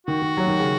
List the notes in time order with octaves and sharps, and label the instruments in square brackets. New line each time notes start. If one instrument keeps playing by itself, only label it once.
[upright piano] D#3 [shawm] F#4
[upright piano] D#3
F#3
D#3
C#3